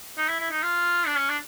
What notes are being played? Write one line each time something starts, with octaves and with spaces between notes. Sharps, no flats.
D#4
E4
E4
D#4
F4
D4
C#4
D4